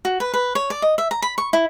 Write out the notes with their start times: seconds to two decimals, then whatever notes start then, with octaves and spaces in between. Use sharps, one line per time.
0.05 F#4
0.20 B4
0.34 B4
0.55 C#5
0.70 D5
0.82 D#5
0.98 E5
1.11 A#5
1.22 B5
1.38 C#6
1.53 E4